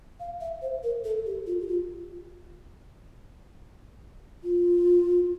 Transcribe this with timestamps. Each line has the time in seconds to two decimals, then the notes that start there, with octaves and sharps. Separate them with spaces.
0.20 F5
0.41 E5
0.62 C5
0.83 A#4
1.04 A4
1.26 G4
1.47 F4
1.61 G4
1.68 F4
4.43 F4